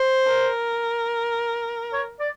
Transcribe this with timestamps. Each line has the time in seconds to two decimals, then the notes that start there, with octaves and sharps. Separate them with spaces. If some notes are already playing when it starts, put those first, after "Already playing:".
Already playing: C5
0.28 A#4
1.93 C#5
2.20 D5